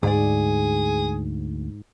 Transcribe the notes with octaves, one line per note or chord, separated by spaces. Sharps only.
D2 G#2 G#4 D5